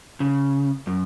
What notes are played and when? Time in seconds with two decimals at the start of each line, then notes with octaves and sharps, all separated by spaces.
0.20 C#3
0.87 F#2